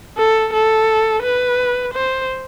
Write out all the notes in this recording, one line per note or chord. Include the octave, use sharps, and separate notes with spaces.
A4
A4
B4
C5